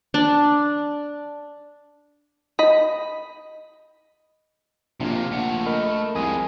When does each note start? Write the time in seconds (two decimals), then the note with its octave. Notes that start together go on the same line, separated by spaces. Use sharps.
0.14 D4
2.59 D#5 B5
5.00 A#1 C3 A#3
5.31 A#1 A3 F#5
5.66 A#4 D#5 B5
6.15 C2 F2 G#3 G#5 D#6